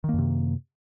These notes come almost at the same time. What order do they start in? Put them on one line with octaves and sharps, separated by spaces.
D#3 A#3 F#2 C3